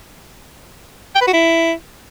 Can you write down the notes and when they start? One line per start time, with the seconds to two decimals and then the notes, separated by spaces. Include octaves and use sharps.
1.15 G5
1.21 B4
1.27 F#4
1.33 E4